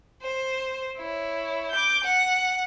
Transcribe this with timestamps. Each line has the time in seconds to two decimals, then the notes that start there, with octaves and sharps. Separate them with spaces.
0.22 C5
0.97 E4 C#5
1.71 D6 G6
2.04 F#5